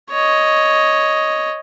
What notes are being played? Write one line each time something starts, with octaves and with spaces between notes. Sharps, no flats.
C#5 D#5